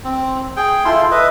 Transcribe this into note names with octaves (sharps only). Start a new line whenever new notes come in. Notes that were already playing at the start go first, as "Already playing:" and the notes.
C4
G#4 G5
E4 F4 A4 C6
B4 D#5 E5